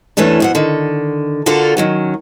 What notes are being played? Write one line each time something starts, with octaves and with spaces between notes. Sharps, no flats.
E2 E3 A3 C#4 D4
F2 B2 F#5
D3 D#3
D3 D4 F4 F#4 A4 A#4
D#3 F#3 C#4